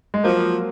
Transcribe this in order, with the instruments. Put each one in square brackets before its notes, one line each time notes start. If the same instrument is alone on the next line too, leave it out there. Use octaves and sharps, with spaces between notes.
[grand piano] G#3
[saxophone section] F3 [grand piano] F#3 A#3